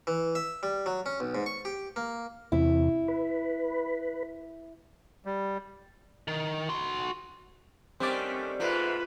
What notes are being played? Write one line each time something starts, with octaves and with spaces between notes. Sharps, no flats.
E3
E5
G3
F#3
C#4
B1
G#2
C#6
G4
A#3
E2 C3 E4
B4
G3
D#3
F#4 C6
D3 D#3 G3 A3 C4 C#4 D5
G#2 C3 A3 F4 B4